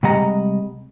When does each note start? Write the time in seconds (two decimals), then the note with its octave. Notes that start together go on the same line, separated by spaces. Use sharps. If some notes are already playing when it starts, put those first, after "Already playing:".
0.03 C3 G3 G#3 D#5 F#5 A#5